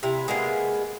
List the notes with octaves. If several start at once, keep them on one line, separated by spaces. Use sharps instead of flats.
C3 E4
G#3 A#3 B3 G#4